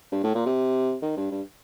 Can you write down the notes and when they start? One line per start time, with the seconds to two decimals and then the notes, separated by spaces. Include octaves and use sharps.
0.12 G2
0.24 A2
0.35 A#2
0.46 C3
1.02 D#3
1.17 G2
1.31 G2